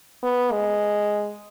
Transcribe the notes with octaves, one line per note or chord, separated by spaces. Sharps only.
B3
G#3